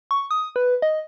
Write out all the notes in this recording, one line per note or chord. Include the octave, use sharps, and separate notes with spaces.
C#6
D#6
B4
D#5